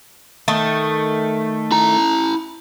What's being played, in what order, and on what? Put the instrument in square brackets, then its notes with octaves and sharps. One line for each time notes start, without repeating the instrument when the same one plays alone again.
[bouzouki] D#3 A3
[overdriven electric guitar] E4 A#5